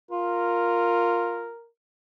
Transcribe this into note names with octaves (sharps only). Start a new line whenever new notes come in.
F4 A#4